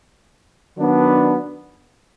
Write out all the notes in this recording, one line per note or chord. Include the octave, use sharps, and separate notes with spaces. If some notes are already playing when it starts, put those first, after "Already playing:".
D#3 F#3 B3 D4